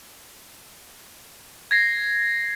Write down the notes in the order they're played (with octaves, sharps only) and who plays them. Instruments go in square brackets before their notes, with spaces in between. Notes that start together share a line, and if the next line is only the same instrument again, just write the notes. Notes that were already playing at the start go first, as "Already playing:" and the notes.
[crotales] G#6 A#6 C7